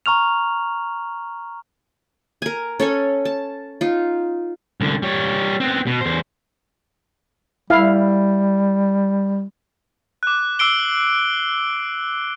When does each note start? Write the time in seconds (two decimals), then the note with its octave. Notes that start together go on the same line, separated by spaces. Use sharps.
0.06 A#5 C#6 F6 F7
2.42 A#4 G#5
2.80 C#4 A4 C#5 G#5
3.25 A5
3.81 D#4 F4
4.81 C2 D3
5.02 G3 C#5
5.60 B3 C4
5.87 B2
6.01 E2 C5
7.70 G3 E4 F5
10.23 D6 F#6
10.59 D6 E6 C7 D7 G7